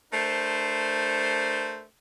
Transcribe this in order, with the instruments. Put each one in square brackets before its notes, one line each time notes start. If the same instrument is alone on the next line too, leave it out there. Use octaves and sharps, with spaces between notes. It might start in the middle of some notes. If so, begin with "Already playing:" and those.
[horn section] A3 D4 A#4 C5